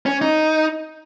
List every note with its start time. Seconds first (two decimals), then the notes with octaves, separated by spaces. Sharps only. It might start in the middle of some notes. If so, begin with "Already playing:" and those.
0.06 C#4
0.21 D#4